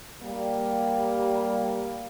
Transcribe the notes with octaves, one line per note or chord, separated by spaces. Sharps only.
G3 A#3